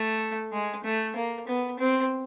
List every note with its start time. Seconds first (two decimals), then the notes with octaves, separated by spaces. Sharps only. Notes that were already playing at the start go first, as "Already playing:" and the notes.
Already playing: A3
0.52 G#3
0.84 A3
1.16 A#3
1.47 B3
1.79 C4